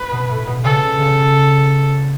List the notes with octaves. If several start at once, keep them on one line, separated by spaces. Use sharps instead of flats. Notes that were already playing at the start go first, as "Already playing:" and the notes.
Already playing: B4
B2
A2
B2
C#3 A4
C#3